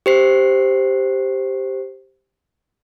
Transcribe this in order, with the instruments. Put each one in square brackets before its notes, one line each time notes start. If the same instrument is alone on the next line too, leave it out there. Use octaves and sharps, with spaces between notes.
[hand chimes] G4 C5 C7